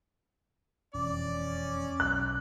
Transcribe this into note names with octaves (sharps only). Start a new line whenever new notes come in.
E1 F2 C#4 D5
B1 F#6